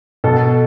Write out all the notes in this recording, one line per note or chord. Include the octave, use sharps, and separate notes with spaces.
B2 A4